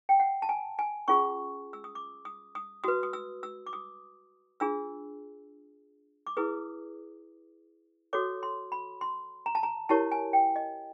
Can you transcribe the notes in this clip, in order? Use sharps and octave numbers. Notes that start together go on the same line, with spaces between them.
G5
F#5
A5
G#5
G#5
C#4 F4 G#4 C#6
E6
D#6
D6
D#6
D#6
F#4 B4 D#6
D#6
E6
E6
D6
D#6
D4 F4 G#4 E6
D6
E4 G#4 B4 D#6
F#4 A4 C#5 D6
C6
B5
C6
A#5
A5
A#5
E4 G4 A#4 C#5 A5
G#5
G5
D#5